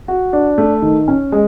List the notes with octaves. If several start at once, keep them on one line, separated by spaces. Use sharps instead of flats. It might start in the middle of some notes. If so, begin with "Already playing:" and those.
F#4
D4
A3
D#3
C#4
G#3